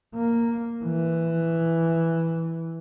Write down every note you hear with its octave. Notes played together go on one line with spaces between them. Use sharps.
A#3
E3